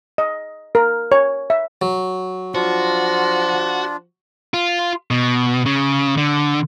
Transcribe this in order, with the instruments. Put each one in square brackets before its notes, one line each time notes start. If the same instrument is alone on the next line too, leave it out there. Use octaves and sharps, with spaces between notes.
[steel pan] D#5
A#4
C#5
E5
[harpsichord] F#3
[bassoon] F3 [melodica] D4 F4 [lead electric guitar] F#4
[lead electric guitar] F4
B2
C#3
D3